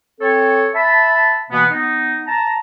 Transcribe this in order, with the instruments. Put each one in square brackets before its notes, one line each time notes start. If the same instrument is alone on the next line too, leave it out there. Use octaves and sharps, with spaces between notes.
[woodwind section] C4 A4 C#5
E5 A5 B5
B2 E3 A#3 B3
B3 D#4
A5 A#5